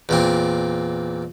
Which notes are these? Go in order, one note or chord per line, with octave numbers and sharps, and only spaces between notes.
E2 A#2 C4